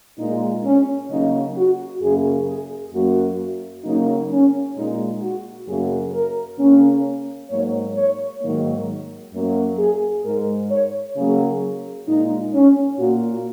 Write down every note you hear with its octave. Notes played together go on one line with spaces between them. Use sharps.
A#2 G#3 D#4
C#4
C#3 F#3 A#3 D#4
F#4
F#2 C#3 A#3 G#4
G#4
F#2 F#3 A#3 F#4
C#3 F#3 A#3 D#4
C#4
A#2 G#3 D#4
F#4
F#2 C#3 F#3 A#3 G#4
A#4
C#3 A#3 C#4
G#2 F#3 A#3 C#5
C#5
G#2 D#3 F#3 A#3 C#5
F#2 F#3 A#3
G#4
G#2 G#3 A#4
C#5
C#3 F#3 A#3 G#4
A#2 G#3 D#4
C#4
A#2 A#3 F#4